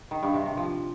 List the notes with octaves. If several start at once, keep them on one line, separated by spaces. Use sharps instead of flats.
D#3
G2
C3
C3
F3